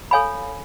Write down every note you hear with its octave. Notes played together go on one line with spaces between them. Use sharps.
A4 C#5 F5 G#5 B5